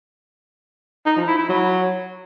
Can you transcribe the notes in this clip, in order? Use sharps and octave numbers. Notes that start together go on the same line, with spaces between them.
D#4
F3
E4
E4
F#3